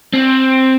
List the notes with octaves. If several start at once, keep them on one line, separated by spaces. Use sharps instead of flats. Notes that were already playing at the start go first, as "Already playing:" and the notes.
C4